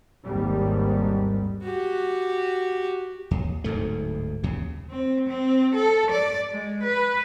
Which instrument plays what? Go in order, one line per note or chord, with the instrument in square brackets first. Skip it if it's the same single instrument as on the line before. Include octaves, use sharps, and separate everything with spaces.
[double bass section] G#1 D#2 G#2 G3
[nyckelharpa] F#4 G4
[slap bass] D#2
D1 D2 G#2 A3
D#2 C#3
[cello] C4
C4
A4
D5
G#3
B4